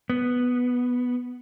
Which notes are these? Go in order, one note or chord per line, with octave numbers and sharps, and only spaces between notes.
B3